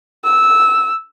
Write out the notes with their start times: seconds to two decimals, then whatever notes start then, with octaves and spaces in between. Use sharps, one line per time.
0.24 E6